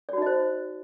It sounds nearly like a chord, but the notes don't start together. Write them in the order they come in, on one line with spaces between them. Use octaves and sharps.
D5 F#4 D#4 D#5 C5